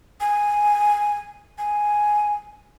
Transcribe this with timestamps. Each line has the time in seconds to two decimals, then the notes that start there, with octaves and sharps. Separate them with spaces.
0.20 G#5
1.58 G#5